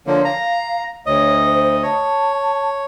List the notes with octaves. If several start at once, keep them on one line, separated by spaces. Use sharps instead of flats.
D3 F3 A#3 C#5
F5 A#5
D2 C#5 D#5
C5
C#5 A5